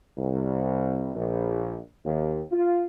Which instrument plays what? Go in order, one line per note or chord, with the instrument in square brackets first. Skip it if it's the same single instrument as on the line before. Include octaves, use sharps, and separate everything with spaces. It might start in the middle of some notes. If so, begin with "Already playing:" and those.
[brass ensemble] C2
A#1
D#2
F4